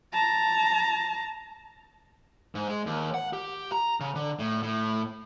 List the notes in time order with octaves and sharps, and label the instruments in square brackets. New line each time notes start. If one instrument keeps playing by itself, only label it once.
[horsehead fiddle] A5 A#5
[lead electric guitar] G#2
G#3
D#2
F#5
G4
A#5
C#3
D3
A2
A2